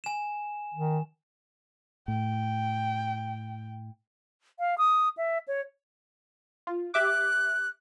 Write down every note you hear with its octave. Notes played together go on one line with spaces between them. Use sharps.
G#5 E7
D#3
A2 G5
F5
D#6
E5
C#5
F4
G4 E5 D6 F#6